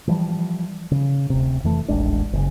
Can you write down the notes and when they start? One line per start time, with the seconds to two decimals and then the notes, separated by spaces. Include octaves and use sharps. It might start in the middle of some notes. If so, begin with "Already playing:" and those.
0.07 E3 F3 G3
0.91 C#3
1.30 D1 C3
1.64 F2 E3 A3
1.88 D#1 A1 G#3 D4
2.33 F#1 C#3